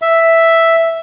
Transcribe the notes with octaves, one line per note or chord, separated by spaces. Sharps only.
E5